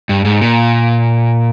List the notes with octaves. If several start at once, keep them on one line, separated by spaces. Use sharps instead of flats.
G2
G#2
A#2